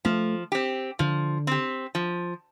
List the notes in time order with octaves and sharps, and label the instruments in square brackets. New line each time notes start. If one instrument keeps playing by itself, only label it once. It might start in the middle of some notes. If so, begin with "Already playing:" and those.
[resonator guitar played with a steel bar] F3 [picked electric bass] A3
[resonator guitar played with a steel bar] C4 G4
[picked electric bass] D3 [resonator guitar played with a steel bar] F3
[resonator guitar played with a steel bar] C4 G4
F3